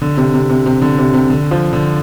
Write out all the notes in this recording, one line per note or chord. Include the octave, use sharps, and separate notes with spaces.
D3
C3
C3
C3
C3
D3
C3
C3
D3
F3
D3